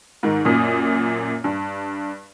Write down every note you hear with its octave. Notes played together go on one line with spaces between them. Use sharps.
G#2 D#3
F#2 A#2 D#6
G2